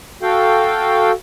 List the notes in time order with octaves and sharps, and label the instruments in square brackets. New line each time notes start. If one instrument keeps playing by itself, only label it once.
[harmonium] F#4 A4 F5 G5